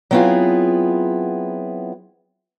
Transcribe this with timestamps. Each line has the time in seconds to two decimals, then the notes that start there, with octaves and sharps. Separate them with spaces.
0.11 F#3 B3 C4 E4 F4 G#4